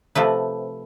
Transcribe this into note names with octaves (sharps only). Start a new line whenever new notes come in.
C3 F3 A3 B4